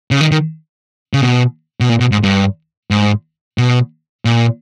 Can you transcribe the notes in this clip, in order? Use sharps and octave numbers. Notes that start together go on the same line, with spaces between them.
C#3
D#3
D#3
C#3
B2
B2
A#2
B2
G#2
G2
G#2
B2
A#2